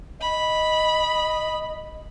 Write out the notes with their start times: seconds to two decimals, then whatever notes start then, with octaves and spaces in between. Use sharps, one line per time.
0.21 D#5 B5